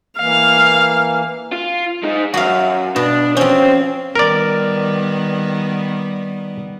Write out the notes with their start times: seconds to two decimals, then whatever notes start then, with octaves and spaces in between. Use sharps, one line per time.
0.18 E3 A#3 F5
1.52 F4
2.03 G#3 D#4
2.34 F#2 F#4 F5
2.96 B2 D4
3.37 F3 C#4 C5 G5
4.15 D#3 G3 B3 A#4 D5